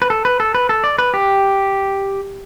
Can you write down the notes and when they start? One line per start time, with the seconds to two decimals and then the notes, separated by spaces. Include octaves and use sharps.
0.02 B4
0.10 A4
0.25 B4
0.40 A4
0.55 B4
0.69 A4
0.84 D5
0.98 B4
1.14 G4